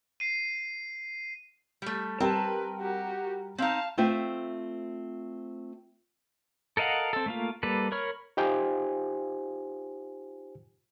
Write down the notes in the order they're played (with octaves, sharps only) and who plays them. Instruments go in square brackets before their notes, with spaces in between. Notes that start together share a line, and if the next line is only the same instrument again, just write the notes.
[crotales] C7 D#7
[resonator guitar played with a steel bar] G3 A3
[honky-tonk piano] G3 A#4 G5 [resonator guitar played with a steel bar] C4 A5 [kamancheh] B4
[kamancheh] F#4 G4
[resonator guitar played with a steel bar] C4 D#4 [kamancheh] F5 A5
[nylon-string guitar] A3 C4 F4 C5 E5
[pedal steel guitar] A4 A#4 D#5 F5 F#5
C4 A4
A3 A#3 F4
G3 A#3 A4 B4
A#4 C#5 B5 C#6 F6
[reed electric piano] D#4 F4 G4 C5 G5 G#5